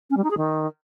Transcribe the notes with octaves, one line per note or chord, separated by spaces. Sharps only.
C#4
G3
D#4
G#4
D#3